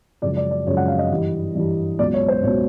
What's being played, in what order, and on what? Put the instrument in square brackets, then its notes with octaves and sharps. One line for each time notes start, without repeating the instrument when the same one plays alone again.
[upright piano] F#2 C#3 F3 G#3 D5
D5
D5
F#2 C#3 F3 G#3 C#5
F#5
F5
D#5
G2 E3 G3
G2 E3 G3
C#2 B2 F#3 D5
C#5
C5
C#2 B2 F#3 C#5